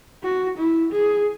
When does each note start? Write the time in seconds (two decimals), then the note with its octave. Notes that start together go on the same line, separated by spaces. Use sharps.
0.23 F#4
0.58 E4
0.93 G#4